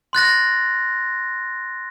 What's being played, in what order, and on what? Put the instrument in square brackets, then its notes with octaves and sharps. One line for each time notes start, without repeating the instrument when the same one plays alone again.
[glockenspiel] C6 F#6 A6 A#6